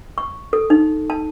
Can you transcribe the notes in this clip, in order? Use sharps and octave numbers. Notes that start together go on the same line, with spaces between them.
C#6
A4
D#4
A5